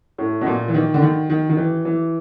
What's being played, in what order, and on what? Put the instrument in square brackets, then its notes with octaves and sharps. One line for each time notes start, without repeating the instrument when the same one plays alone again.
[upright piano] A2
B2
A#2
E3
D#3
D3
D#3
D#3
D#3
E3
E3